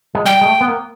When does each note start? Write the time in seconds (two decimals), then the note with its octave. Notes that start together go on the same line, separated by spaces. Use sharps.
0.15 G#3
0.25 G3 G5
0.41 G#3
0.46 A3
0.61 B3
0.68 A#3